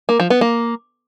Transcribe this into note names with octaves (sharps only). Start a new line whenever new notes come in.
A#3
F3
B3
A#3